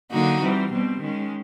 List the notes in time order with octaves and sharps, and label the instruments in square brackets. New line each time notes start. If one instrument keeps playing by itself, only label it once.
[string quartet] D3 F#3 A#3 D#4 F#4
E3 G3 C4
B2 G3 C4
D#3 G#3 C#4